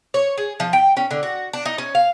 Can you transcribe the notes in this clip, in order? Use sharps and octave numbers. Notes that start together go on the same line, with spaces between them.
C#5
G#4
F3
G5
C#4
D3
F#4
D4
D#4
C#4
F5